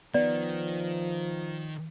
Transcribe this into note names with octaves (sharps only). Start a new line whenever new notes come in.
D#3 F3 B3 D5